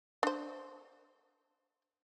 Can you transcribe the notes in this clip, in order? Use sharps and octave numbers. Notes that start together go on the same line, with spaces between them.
D4 C5